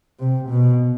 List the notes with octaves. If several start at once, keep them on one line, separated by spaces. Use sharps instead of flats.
C3
B2